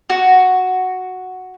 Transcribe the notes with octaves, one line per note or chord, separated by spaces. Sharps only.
F#4